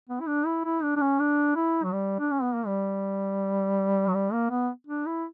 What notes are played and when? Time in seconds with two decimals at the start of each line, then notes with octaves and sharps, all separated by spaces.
0.09 B3
0.20 E4
0.27 D4
0.46 E4
0.64 E4
0.83 D4
0.97 D4
1.01 C#4
1.19 D4
1.56 E4
1.84 F#3
1.93 G3
2.19 D4
2.31 C#4
2.42 B3
2.55 A#3
2.67 G3
4.08 F#3
4.14 G3
4.32 A#3
4.50 B3
4.87 D4
5.06 E4